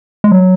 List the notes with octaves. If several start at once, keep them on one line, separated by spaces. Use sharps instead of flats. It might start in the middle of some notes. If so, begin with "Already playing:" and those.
G#3
F#3